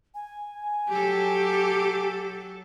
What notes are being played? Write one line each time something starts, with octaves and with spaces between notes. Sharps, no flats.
G#5
F#3 G4 A4